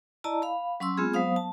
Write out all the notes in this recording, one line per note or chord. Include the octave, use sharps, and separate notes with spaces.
E4 D5 D#5 A5 A#5
F5 B5
F#3 C#4 C6 E6
G#3 B3 C4 F4 G#4
F#3 B3 C5 F5 D#6
A5